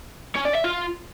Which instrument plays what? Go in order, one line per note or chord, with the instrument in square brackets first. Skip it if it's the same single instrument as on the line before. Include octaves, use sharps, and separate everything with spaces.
[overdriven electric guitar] C#4
D5
E5
F4